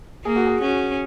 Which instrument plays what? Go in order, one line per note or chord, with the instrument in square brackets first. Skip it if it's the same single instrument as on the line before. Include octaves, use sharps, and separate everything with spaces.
[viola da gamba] A#3 [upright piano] G#4
[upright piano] F#4
G#4
[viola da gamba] C#4 [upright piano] F#4